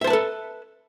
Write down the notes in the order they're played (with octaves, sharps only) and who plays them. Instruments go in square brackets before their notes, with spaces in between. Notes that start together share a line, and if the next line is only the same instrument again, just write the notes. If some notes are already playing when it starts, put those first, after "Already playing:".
[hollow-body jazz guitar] E5
C5
A5
B4
A4